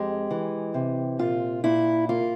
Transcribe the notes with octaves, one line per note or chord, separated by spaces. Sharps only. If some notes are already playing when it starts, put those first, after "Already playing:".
Already playing: F2 G#3 G4
E3
C3
A#2 F4
A#2 E4
A#3 F4